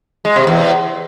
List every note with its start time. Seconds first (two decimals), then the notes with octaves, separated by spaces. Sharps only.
0.25 G#3
0.36 C3
0.47 E2